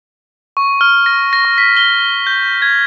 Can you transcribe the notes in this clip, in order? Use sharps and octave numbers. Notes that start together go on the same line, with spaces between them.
C#6
F6
A#6
A#6
C#6
B6
G7
G6
G#6